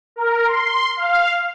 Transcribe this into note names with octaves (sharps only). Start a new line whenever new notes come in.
A#4
C6
F5